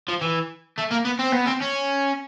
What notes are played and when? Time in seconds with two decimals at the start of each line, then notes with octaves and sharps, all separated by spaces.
0.09 F3
0.22 E3
0.78 A3
0.92 A#3
1.05 B3
1.19 C4
1.32 B3
1.45 C4
1.61 C#4